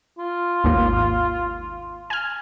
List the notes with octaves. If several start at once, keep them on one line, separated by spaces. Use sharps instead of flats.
F4
G#1 D#2 A#3
G#5 F6